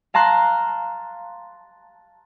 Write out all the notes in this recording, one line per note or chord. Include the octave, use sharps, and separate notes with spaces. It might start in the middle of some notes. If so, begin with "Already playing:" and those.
F5 A5 A#5 C6 F#6